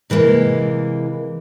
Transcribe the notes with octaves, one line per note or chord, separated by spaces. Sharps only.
C3 E3 G#3 A#3